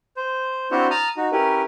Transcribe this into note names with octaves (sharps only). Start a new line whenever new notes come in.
C5
C4 D4 E4 F#4 C5 C#5
A5 A#5 D#6 F6
D#4 F#4
C#4 E4 G4 A#4 B4